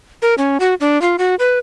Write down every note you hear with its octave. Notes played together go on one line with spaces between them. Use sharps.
A#4
C#4
F#4
D4
F4
F#4
B4